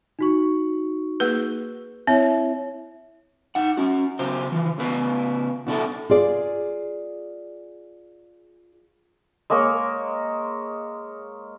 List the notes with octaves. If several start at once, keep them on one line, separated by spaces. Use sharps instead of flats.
D#4 F#4 C#6
A#3 G#4 B4
C4 E4 C#5 E5
D#4 F#5
C#4 F#4
C#3 F#3 C5
E3 F3
C#3 B3 B4 F5
B2 D4 E4 A4
F4 G#4 D5
G#3 A#3 A#4 C#5